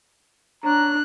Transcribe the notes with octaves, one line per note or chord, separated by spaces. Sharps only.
D4 C#5 A#5 F#6